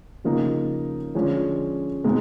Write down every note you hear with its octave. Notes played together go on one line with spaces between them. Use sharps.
C#3 F3 A#3 D#4
D3 F3 G#3 C#4
B2 G#3 C4 D#4